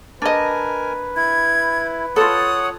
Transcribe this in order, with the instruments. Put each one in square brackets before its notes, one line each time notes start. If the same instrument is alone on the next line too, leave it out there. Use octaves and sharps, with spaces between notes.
[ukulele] D4 D#5 [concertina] A#4 G#5 [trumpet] B4
[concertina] E4 [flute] G#6
[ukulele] F4 A4 [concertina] C#5 F#5 [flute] D#6